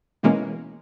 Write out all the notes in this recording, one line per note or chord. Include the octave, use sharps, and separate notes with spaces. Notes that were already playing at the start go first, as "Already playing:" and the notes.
B2 E3 G#3 A#3 C#4